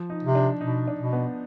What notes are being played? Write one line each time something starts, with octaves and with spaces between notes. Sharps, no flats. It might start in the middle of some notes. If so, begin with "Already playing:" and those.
Already playing: F3
D#4
C3
D4
B2 D#4
D4
B2
B3